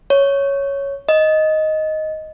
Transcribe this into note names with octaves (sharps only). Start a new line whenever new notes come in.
C#5
D#5